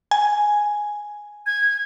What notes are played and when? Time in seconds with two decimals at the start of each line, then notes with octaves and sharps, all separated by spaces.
0.11 G#5
1.46 G#6